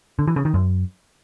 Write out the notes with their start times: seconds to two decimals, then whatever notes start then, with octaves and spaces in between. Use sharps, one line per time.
0.19 D3
0.27 E3
0.36 C#3
0.45 D#3
0.54 F#2